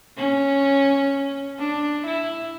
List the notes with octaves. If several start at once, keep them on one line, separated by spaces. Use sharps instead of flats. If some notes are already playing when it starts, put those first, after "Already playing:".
C#4
D4
E4